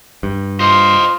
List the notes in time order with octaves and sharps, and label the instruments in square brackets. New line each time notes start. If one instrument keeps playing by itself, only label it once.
[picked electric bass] G2
[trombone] F4 [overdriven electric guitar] C5 D#5